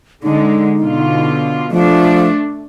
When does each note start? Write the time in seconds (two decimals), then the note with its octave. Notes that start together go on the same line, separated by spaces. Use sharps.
0.23 D3 G#3 D#4
0.82 B2 D3 F4
1.71 F3 A3 D4